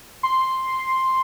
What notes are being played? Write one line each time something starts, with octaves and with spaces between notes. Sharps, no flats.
C6